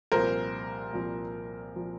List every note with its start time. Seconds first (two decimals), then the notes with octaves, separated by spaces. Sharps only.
0.12 C2 A#2 F3 A#4 C5
0.92 C2 A#2 F3
1.75 A#2 F3